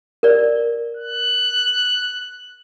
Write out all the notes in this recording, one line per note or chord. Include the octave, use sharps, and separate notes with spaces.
A#4 D5
F#6